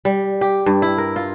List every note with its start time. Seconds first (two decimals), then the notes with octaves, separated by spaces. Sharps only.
0.05 G3
0.41 G4
0.66 G2
0.82 E4
0.98 A#4
1.16 F4